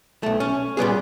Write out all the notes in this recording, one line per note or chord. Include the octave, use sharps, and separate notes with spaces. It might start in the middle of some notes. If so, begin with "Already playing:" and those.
B1 A3
C#4
A#2 G3 B3 G#4